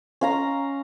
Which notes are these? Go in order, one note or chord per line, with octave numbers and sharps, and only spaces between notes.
C#4 F5 A#5